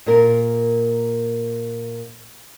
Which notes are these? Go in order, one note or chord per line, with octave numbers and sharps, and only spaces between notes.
A#2 A#4